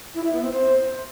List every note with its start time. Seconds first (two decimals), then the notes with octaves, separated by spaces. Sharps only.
0.15 E4
0.24 E5
0.33 B3
0.42 C4
0.51 C5